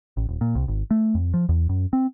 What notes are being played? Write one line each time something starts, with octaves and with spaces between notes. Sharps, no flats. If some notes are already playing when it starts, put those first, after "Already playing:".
A1
D#1
A#2
C2
G#1
A3
F2
F3
E2
F#2
C4